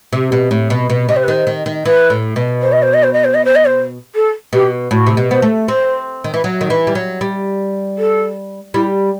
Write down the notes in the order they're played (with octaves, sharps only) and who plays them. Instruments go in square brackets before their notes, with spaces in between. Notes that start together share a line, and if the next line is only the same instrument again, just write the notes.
[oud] C3
B2
A2
B2
B2
[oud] C3 [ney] D#5
[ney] C5
B4
[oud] D#3 [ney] C5
[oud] D#3
D#3
[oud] E3 [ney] B4
[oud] A2
B2
[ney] C5
D#5
C5
D#5
C5
D#5
C5
D#5
C5
D#5
C5
A4
[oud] B2 [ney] G4
[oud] A2 [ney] F#4
[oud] C3
B2
[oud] B3 [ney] C5
[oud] A3
[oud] C4 [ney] C5
[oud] D#3
E3
F#3
D#3
E3
G3
F#3
G3
[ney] A4
[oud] G3 [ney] E4